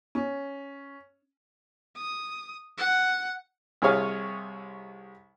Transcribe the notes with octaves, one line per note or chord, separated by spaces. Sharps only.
C#4
D#6
F#5
C2 C3 G#4 C#5 F5